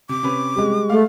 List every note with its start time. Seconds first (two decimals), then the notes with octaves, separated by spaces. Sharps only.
0.09 C3 D6
0.23 C3 C#4 B4
0.56 G3 G#3
0.90 A3 F5